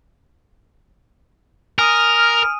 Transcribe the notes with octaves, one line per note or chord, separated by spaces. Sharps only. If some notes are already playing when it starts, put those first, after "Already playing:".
A#4 G#5 D#6 F6 D#7